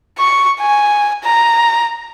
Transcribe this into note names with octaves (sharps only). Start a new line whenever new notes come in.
C#6
G#5
A#5